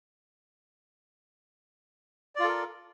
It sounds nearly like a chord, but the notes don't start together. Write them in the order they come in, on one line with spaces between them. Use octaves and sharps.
D5 F4 A4 A#4